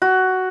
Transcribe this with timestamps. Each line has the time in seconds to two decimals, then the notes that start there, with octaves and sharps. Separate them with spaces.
0.02 F#4